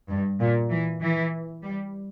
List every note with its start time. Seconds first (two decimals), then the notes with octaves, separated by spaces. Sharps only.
0.09 G2
0.40 A#2
0.70 E3
1.01 E3
1.63 G3